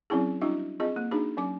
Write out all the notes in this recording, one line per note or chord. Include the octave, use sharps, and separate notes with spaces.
F#3 C4 C#4 E4 G#4
G3 D4 E4 F#4 E5
C4 F4 G#4 D#5
A#3
D4 D#4 F#4 G#4
F#3 C#4 D6